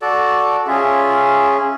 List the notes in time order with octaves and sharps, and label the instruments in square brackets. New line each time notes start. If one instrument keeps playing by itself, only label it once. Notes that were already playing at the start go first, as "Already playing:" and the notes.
[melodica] F#4 A4 D5
[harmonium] C#4 G#4 [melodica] F4 E5